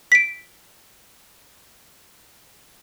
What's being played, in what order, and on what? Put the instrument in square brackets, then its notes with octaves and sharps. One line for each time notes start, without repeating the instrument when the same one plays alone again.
[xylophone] B6 D7